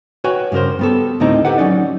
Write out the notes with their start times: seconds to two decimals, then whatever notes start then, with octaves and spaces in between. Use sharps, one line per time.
0.24 F#4 B4 C#5 G5 G#5
0.52 G2 C#3 E4 A#4 C5
0.79 G3 B3 A4
1.20 D2 A2 D#3 C4 D#4 A#5
1.45 G4 A4 B4 F#5
1.58 F#3 C#4 D#4 D5